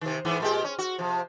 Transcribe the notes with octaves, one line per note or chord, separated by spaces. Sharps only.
C3 D#3
G#2 E3 B3
A#2 G#3 G4
C#4
F#4
C3 F3